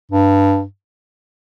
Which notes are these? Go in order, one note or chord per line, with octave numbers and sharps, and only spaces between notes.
G2